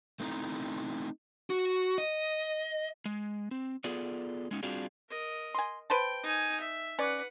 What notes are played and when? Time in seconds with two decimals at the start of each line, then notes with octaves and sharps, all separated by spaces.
0.20 A3 C4 D#4 E4 A#5
1.50 F#4
1.98 D#5
3.05 G#3
3.51 C4
3.84 B3 F4 G#4 A4 D5
4.51 G#3 C#4 D#4
4.63 G3 C4 D4 F4 F#4 G#4
5.10 A#4 D#5
5.55 G#5 C6
5.90 B4 C5 G5 A5
6.23 D#4 G#5
6.60 E5
6.99 C#4 B4 D5 F#5